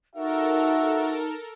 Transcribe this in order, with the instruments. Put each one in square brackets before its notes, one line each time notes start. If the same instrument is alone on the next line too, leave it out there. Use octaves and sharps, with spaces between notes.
[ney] D#4 [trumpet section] F#4 E5 [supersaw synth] A4 A#4